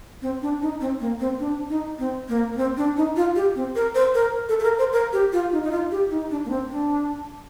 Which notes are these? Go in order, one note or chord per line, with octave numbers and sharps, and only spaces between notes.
C4
D4
D#4
C4
A#3
C4
D4
D#4
C4
A#3
A#3
C4
D4
D#4
F4
G4
C4
A#4
C5
A#4
A4
A4
A#4
C5
A#4
G4
F4
D#4
D#4
F4
G4
D#4
D4
A#3
C4
D4